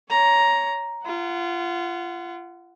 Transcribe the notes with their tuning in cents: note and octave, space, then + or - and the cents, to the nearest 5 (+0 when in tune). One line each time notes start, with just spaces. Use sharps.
C#5 +15 A#5 +5
F4 -25 F#5 +0